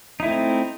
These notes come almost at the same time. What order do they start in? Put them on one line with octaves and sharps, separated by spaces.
D#4 E4 A3 C4